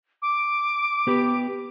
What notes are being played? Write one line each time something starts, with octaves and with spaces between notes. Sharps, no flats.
D6
B3 G4 B4